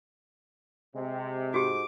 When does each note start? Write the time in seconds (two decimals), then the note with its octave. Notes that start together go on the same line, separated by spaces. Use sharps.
0.95 C3 G#3
1.54 G#2 F#4 G4 D6